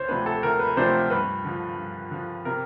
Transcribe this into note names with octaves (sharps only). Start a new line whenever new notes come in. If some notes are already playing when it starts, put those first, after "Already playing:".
Already playing: D2 C5 C#5
C3 F3 A3 D4 B4
A4
D2 A#4
B4
C3 F3 A3 D4 C5
G2 B4
D3 F3
G2
D3 F3
C3 A#4